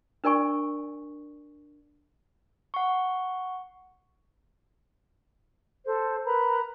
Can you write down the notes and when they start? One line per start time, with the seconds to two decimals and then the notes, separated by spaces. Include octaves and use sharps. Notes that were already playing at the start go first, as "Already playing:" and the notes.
0.24 D4 A#4 D5 G#5 C#6
2.74 F#5 C#6
5.86 A4 C5
6.26 A#4 B4 A#5 B5